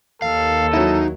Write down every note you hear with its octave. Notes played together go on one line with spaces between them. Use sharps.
D#2 A4 F5
F#3 D#4 E4